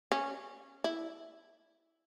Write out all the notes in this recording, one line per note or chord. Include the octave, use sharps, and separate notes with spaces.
C#4
E4